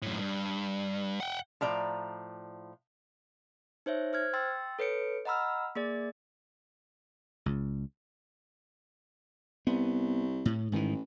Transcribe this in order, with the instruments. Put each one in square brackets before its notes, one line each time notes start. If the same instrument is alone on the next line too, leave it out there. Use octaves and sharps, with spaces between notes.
[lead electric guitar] F#2 A2
G2
F#5 G5
[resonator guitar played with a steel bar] A2 F3 D5 A#5
[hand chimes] D#4 C5 C#5 E5
C5 F6 G#6
G5 C6 E6 A6
A4 B4 C#5 C#7 D7
D#5 F#5 A#5 B5 E6 F6
A#3 G#4 D5 A6
[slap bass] C#2
[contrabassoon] C2 [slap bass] B3
[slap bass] A2
[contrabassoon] A1 [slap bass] G#2 D#3 E3